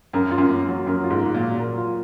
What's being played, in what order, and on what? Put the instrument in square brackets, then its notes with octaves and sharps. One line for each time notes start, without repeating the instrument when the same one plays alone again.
[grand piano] F#2 [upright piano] A#4
[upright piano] F4
[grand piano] F#2
[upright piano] A#3
F#3
[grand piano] F#2 [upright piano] A#4
[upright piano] F4
[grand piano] G#2
[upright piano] A#3
[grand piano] A#2
[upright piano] F#3
A#4
F4